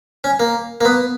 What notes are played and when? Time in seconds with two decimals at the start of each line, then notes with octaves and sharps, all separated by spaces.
0.24 C#4
0.40 A#3
0.81 A#3
0.85 B3